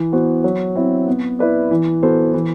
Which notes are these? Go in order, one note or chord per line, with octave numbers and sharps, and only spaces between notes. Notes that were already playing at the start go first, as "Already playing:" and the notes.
Already playing: E3
B3 F#4 C5
F#3
C4 E4
B3
E4 B4 D5
E3
B3 F#4 A4 C5
E3